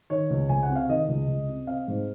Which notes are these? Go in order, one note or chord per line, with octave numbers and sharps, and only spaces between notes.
D#3 C#5
C#2
C#2 G#5
F#5
C3
F5
D#3 D#5
C#2
C#2
C3
C4 F5
G#2